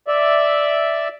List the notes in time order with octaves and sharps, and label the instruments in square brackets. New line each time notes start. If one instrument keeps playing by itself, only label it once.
[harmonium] D5 E5